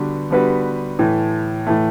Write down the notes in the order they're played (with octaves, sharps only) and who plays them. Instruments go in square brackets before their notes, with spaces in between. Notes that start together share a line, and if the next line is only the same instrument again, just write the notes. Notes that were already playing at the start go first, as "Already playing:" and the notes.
Already playing: [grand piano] D3 G3 B3 F#4 B4
D3 G3 B3 F#4 B4
A2 E3 A3
A2 E3 A3